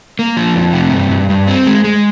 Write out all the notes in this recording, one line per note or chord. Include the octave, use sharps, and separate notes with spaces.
A#3
F3
F2
C3
G2
G2
G2
C4
G#3
G#3